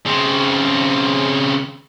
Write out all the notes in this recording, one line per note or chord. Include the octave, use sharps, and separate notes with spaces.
C#3 C4